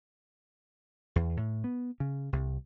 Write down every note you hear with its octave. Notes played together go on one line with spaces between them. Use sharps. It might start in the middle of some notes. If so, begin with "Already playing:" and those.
E2
A2
B3
C#3
C2